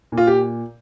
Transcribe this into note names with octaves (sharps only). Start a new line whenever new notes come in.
A#2
F4
G4